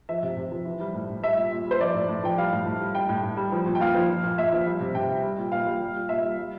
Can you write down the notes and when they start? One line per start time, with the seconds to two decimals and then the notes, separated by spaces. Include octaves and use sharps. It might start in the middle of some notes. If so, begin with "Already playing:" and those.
0.09 F3 E5
0.23 C3
0.37 C3
0.52 F3
0.65 E3
0.80 G3
0.94 A2
1.09 A2
1.22 G3 E5
1.37 A#2
1.52 A#2
1.67 G3 C5
1.80 F3 D5
1.94 A2
2.08 A2
2.24 F3 G5
2.38 G3 F5
2.52 A2
2.65 A2
2.80 G3
2.94 G3 G5
3.09 A2
3.23 A2
3.37 G3
3.52 F3
3.66 A#2
3.75 G5
3.80 A#2 F5
3.95 F3
4.09 F3
4.24 A#2
4.37 A#2 E5
4.53 F3
4.66 G3
4.81 C3
4.95 C3 G5
5.09 G3
5.23 G3
5.38 A#2
5.52 A#2 F5
5.66 G3
5.81 G3
5.96 A#2
6.09 A#2 E5
6.24 G3
6.38 G3